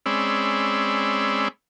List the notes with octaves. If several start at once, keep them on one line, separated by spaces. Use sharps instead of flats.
G#3 C4 C#4 D5 B5 E6